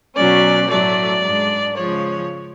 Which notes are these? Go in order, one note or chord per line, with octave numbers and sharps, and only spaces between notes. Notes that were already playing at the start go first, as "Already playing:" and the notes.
B2 F#3 C#4 D5
A2 F#3 A3 D5
G#2 G#3 D4
C#3 F3 G#3 C#5